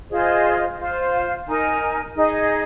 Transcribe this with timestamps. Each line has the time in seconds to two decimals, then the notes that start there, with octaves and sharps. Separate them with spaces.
0.11 F4 G#4 C5 D#5
0.79 F4 C5 F5
1.46 D#4 A#4 G#5
2.15 D#4 G#4 D#5